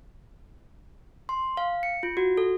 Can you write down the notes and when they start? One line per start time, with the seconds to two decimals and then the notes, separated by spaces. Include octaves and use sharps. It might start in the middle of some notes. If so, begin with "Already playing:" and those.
1.29 C6
1.57 F5
1.83 C#7
2.03 F4
2.17 F#4
2.38 A4